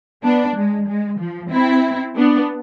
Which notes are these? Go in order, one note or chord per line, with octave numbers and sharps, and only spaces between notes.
B3 D4
G#3
G#3
F3
C4 E4
B3 D4